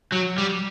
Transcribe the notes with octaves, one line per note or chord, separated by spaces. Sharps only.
F#3
G3